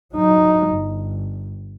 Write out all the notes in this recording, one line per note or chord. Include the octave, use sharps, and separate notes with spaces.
F#3 D#4
G1